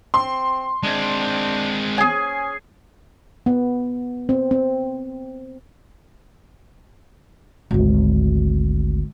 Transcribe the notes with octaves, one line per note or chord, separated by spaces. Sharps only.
C4 C6
G#3 C4 D4
C#4 G#4 G#5
B3
C4
C4
G#1 D2